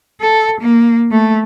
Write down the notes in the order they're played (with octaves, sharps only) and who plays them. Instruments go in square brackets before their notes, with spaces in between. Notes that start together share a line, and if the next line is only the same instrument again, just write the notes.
[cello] A4
A#3
A3